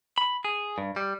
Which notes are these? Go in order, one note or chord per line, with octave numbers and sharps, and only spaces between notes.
B5
G#4
G2
G3